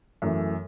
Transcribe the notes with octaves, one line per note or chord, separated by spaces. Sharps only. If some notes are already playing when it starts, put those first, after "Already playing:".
F#2 E3 A3